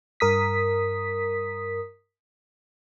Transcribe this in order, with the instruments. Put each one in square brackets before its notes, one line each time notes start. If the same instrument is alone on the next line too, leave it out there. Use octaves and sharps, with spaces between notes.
[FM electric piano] G2 A#4 D#6 B6